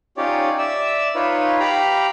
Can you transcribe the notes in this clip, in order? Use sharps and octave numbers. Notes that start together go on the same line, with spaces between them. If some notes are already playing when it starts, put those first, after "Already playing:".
C#4 D#4 F4 G4 C#5 D5
D5 E5 E6
D#4 F4 B4 C#5
G4 F5 G5 A#5 B5